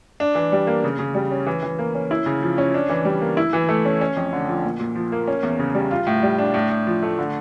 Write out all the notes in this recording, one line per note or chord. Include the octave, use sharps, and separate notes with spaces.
D4
E3
G3
A#3
C#3
C#3
G3
C#4
E3
E3
A#3
C#4
E4
C#3
F3
C#4
D4
E3
G3
A#3
E4
E3
A3
C#4
C#4
F2
D3
F3
A#2
A#2
F3
A#3
C#4
E2
C#3
G3
F4
A2
G3
D4
A2
A2
F3
A3
D3